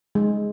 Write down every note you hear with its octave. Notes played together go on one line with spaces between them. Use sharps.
G#3